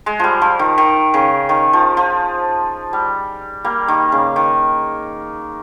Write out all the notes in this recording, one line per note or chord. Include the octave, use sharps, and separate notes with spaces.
G#3
F3 G3
F3
D#3
D#3
C#3
D#3
F3
F3
G3
G3 A#3
D#3
C#3
D#3